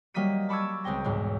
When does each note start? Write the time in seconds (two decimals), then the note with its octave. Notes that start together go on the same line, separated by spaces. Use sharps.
0.14 F#3 G3 A#3 D#5 B6 D#7
0.49 A5 B5 C#6 D6 E6 G#6
0.84 C#2 G#3 C4 G5 A#6
1.04 B1 E2 G#2